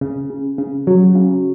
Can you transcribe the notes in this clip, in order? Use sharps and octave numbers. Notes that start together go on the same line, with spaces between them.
C#3
C#3
C#3
F#3
C#3